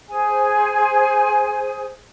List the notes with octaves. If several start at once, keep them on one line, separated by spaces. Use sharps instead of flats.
G#4 C5 G#5